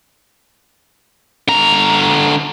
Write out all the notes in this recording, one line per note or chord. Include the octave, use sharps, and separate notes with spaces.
D3 A#5